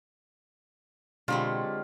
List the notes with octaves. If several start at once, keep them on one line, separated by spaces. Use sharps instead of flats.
B2 D3 F#3 G#3 C4 F4 G4 B5